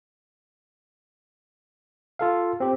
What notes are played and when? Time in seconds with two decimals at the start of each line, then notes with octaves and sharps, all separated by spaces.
2.19 F4 A4 F5
2.60 C4 G4